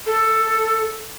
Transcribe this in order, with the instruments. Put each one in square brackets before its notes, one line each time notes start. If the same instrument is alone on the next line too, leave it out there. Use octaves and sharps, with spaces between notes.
[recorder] A4